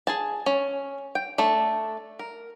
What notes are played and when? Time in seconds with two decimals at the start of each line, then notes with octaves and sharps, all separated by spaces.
0.07 G#4 G#5 A5
0.46 C#4
1.15 G5
1.38 A3 D4 A4
2.19 A#4